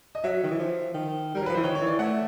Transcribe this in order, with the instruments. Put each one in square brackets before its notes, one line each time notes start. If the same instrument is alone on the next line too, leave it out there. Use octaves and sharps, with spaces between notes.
[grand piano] D#5
[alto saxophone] F#3 [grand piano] E5
[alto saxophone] D#3
E3
F3
D#3
[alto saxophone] G3 [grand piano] A#4
[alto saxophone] F#3
[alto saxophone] F3 [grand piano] B4
[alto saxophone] E3 [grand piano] C5
[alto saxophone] D#3 [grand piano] C#5
[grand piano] C#5
[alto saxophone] E3
[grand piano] D5
[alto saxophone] A3 [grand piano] F#5